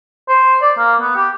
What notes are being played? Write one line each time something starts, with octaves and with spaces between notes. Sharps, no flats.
C5
D5
A#3
B3
G4